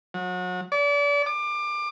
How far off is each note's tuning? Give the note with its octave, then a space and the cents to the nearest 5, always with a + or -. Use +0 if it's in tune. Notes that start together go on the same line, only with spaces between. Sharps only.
F#3 -30
D5 -35
D6 +25